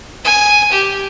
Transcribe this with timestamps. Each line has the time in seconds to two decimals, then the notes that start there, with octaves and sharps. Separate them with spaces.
0.25 G#5
0.71 G4